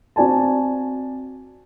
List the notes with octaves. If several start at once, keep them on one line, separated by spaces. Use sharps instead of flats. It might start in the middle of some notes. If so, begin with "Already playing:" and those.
C4 F#4 D5 G#5 A5